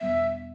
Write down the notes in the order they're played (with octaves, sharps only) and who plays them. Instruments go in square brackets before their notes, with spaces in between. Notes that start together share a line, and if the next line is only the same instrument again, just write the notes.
[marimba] E2 B2 G3 B3 [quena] E5